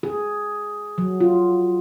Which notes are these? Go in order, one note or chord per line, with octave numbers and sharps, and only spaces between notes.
G#4
F#3
F4